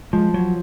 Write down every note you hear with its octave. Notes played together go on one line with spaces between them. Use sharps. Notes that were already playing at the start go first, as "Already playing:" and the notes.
F3 G#3
F#3